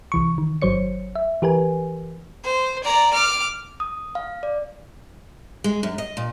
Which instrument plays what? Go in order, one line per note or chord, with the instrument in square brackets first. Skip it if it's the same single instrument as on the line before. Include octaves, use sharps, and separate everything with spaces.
[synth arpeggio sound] C2 E3 C#6
D#3
G1 F#3 C5 C#5 C#7
E5
E3 G4 A#4 B4 G#5
[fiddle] C5
D5 A#5
D6 F6
[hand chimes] D#6
F5
D5
[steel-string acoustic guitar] G#3
F#2
D#5
A#2